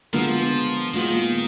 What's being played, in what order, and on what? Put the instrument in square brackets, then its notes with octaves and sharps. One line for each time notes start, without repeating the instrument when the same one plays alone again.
[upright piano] D3 G#3 B3 F4 A#4 [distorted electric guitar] F3
[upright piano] A#2 G#3 B3 F4 [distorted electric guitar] D#3